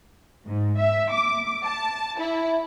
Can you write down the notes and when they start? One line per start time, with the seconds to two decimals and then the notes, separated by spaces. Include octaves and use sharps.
0.47 G#2
0.78 E5
1.11 D6
1.64 A5
2.19 E4